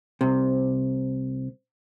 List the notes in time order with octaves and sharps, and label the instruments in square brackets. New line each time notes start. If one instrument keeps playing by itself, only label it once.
[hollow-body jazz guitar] C2 C3